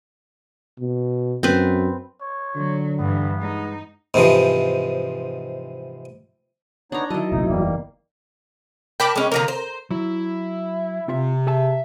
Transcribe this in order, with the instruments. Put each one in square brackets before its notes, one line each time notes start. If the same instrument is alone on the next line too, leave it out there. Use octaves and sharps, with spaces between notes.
[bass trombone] B2
[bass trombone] F#2 [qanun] C4 B4
[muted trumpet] C#5
[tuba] D3 [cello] F#3
[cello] G2 E3 [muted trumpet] B3
[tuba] G#3 [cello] D#4
[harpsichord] G#2 C3 E3 F3
[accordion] B3 D#4 C#5 [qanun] D4 A#5
[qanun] D#3 D#5 [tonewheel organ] F#3 E4 [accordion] A5
[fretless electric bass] F1 A#1 F2 [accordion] D#4
[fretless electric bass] F#1 E2 E3 [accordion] G3 A#3
[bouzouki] A#4 A5 [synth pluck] G5 B5 D6
[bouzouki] G#3 C#4
[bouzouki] D3 F3 A#3 [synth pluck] A#4 A#5
[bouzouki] C5
[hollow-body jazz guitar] F#3 [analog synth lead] E4
[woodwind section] C3 [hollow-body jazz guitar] C4 F4 E5
[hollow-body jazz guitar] G#4 G#5 A5 [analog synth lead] E5